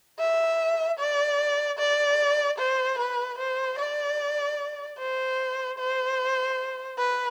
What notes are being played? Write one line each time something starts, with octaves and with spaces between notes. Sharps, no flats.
E5
D5
D5
C5
B4
C5
D5
C5
C5
B4